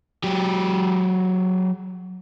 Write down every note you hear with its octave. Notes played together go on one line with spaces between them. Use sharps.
F#3 G4